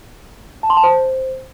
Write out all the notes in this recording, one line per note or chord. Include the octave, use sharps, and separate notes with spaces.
A5
C6
A5
C5